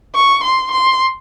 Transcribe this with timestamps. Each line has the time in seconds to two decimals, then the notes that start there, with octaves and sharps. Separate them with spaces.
0.15 C#6
0.44 C6
0.72 C6